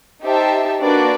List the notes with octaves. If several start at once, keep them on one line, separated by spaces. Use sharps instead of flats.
D#4 G4 C5 E5 A5
A#3 D4 F#4 B4 D5